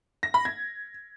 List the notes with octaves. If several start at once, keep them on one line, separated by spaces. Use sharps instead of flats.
A#6
B5
G#6